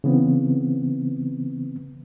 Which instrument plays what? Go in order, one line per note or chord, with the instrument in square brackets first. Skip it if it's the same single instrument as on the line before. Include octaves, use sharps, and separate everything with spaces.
[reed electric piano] C#3 E3 B3 C4